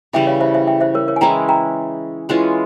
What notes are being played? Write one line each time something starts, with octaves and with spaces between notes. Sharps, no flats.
C#3 E3 G3 E5 G5
C#5 F5
C5 E5
C5 E5
E5 G5
C5 E5
A#4 C#5
A#4 C#5
G#5
E3 G#3 C#4 E4 G5 A#5
G5 A#5
E3 G#3 C#4 F4